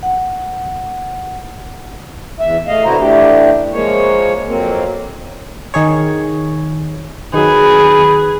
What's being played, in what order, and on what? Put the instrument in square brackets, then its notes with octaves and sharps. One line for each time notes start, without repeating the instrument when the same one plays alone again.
[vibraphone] F#5
[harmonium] E2 E5
A3 D#5 F5
B2 D3 E4 F#4 C5 A#5
E3 A3 D4 G4
F3 G#3 A#3 C#5
F2 F#3 A#3 C4
[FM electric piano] D#3 G#4 C#5
[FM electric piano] D#3 F#3 [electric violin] G#4 [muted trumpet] B4